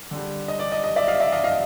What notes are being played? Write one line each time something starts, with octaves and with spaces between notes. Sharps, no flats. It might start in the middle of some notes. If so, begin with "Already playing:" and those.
D3 G3
D#5
D5
D#5
D#5
D5 E5
D#5 F5
D5 E5
D#5 F5
D#5 F5